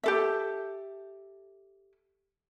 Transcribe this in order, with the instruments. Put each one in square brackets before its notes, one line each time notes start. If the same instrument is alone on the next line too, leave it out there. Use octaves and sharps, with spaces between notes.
[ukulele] G4 A4 E5